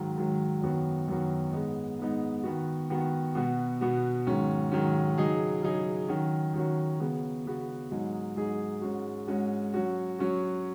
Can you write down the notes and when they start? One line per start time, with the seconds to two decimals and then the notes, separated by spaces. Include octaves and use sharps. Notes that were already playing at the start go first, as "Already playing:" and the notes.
Already playing: G#2 D#3 F#3
0.16 G#2 D#3 F#3
0.61 F#2 D#3 B3 F#4
1.08 F#2 D#3 B3 F#4
1.52 G#2 G#3 B3 D#4
1.99 G#2 G#3 B3 D#4
2.43 D#3 B3 F#4
2.90 D#3 B3 F#4
3.35 B2 B3 F#4
3.81 B2 B3 F#4
4.26 G#2 D#3 F#3 C#4
4.72 G#2 D#3 F#3 C#4
5.17 C#3 F#3 D#4 G#4
5.62 C#3 F#3 D#4 G#4
6.08 D#3 F#3 C#4 F#4
6.54 D#3 F#3 C#4 F#4
7.00 C#3 B3 F#4
7.46 C#3 B3 F#4
7.91 G#2 F#3 D#4 G#4
8.36 G#2 F#3 D#4 G#4
8.82 G#2 G#3 C#4 F#4
9.27 G#2 G#3 C#4 F#4
9.74 F#3 C#4 F#4
10.19 F#3 C#4 F#4